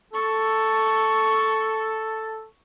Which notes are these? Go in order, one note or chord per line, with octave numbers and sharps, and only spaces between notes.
A4 C#6